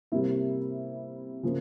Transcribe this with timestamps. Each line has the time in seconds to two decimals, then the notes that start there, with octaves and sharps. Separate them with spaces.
0.12 C3 G3 A#3 E4
1.43 C#3 F3 A#3